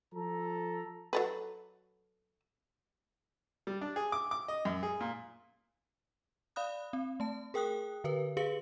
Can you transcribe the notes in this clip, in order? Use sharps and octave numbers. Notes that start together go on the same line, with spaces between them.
F3 A4 A#5
F#3 A4 B4
G3
D4
G#4
D6
D6
D#5
F#2
G#4
A#2
D5 F5 B5 D#6 F#6
C4
A3 A5
G#4 A#4 G5 D#6 F#6
D3 A#4 B4
G4 G#4 B4 F5 C#7 F#7